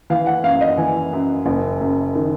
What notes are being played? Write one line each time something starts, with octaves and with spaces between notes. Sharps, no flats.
E3 F5
F#5
F#2 F5
D#5
E3 G#5
F#2
F#1
F#2
D#3